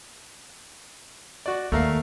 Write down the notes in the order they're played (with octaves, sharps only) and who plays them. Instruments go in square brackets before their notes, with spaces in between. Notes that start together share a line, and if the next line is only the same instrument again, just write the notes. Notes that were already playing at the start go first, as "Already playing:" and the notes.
[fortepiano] F#4 D5
[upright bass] D#2 [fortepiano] A3 A#4 F5